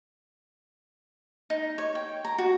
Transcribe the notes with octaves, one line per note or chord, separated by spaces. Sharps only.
D#4
C#5
G5
A#5
F#4